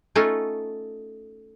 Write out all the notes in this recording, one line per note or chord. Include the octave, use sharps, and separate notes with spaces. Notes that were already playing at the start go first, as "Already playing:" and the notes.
A3 C#4 D#4 F4 A4